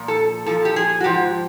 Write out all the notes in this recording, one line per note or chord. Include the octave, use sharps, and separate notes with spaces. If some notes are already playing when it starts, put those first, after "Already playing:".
Already playing: A#2 F3
A4
A#2 F3 A4
G4
G#4
F#4
G#2 F3 G4